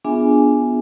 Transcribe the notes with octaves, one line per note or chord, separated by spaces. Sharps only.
B3 D4 F4 G#4 E5 G#5